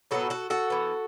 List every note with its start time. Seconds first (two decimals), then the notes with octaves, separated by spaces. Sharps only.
0.11 A2 F#3 B3 F#4 A4
0.30 F#4 A4
0.50 F#4 A4
0.70 E3 B3